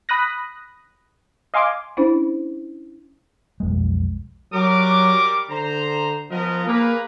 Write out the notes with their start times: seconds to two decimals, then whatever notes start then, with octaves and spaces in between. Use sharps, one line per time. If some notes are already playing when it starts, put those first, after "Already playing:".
0.09 B5 D#6 F#6 A#6
1.54 D#5 F5 G#5 C6 D6
1.97 C#4 D4 E4 C5
3.60 B1 F2 G#3
4.53 F#3 G3 A#4 D6
5.50 D3 C5 A#5
6.31 F3 B3 A#4 D#5
6.67 A#3 G#4 B4 A#5